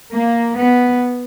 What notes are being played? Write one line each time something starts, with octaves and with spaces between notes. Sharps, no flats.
A#3
B3